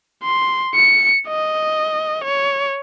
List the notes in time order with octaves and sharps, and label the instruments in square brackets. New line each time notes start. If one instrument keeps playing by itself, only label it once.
[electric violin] C6
C#7
D#5
C#5